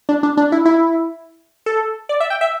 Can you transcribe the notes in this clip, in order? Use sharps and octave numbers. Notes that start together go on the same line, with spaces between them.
D4
D4
D4
E4
E4
A4
D5
E5
G5
E5